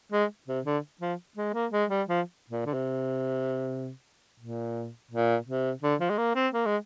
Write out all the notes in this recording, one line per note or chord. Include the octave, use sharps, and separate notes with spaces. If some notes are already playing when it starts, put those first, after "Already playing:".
G#3
C3
D3
F3
G#3
A#3
G#3
G3
F3
A#2
D3
C3
A#2
A#2
C3
D3
F3
G#3
A#3
C4
A#3
G#3